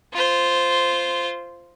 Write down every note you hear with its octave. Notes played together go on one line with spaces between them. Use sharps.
F4 C5